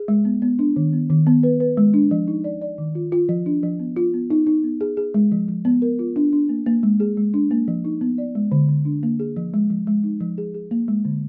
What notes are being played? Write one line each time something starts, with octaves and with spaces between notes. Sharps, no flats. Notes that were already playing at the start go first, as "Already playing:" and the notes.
Already playing: G#4
G#3
B3
B3
D4
D#3
B3
D#3
B3
B4
B4
G#3
D4
F3
D#4
D5
D5
D#3
F4
F4
F3
D4
F3
B3
F4
B3
D#4
D#4
B3
G#4
G#4
G#3
F3
F3
B3
A#4
F4
D4
D4
A#3
A#3
G#3
G#4
G#3
D4
A#3
F3
D#4
B3
D5
G#3
D3
D3
D4
A#3
G#4
F3
G#3
F3
G#3
D#4
F3
G#4
G#4
A#3
G#3
D3